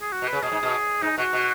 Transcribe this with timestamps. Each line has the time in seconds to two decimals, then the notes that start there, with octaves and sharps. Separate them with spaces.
0.01 G#4
0.12 F#4
0.22 B2
0.27 B4
0.33 C#3
0.43 B2 G#4
0.52 G#2
0.63 B2
1.02 G#2 D#4
1.18 B2 F#4
1.33 B2